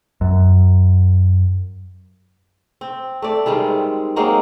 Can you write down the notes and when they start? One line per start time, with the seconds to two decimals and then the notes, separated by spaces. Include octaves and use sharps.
0.21 F#2
2.81 C4
3.22 A3 D5
3.46 D#3 G3 G#3 C4
4.16 F#3 G#3 A#3 C4